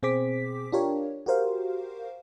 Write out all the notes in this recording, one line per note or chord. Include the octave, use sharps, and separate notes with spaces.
B2 C4 G#4 C5 D6 B6
D4 F4 G4 A#4 C#5
F#4 G4 A#4 C5 F5